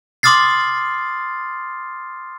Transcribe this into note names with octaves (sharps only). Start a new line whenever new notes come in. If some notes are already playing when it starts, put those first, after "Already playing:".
C6 D6 D#6 F6 A6 C7